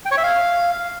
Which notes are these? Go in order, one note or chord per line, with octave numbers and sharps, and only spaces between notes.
G5
C#5
E5
F5